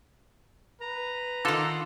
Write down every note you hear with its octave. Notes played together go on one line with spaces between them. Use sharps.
B4 A#5
D3 D#3 F4 A4